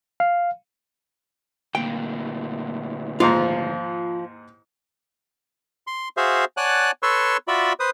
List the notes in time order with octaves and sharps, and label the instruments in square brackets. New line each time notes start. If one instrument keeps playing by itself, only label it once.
[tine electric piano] F5
[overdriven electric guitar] D2 A#2 [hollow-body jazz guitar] G5
[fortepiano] D#2 G#2 A#5 [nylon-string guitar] F3 [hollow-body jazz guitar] F4
[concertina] C6
F#4 G#4 C5 E5 F5
C#5 D5 F#5 G#5 A5 F#6
A4 B4 C#5 C6 C#6 E6
F4 F#4 D5 E5 B5
B4 C5 D#6